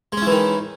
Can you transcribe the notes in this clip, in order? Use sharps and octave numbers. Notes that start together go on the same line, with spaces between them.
D#3 E3 G#3 C#4 E4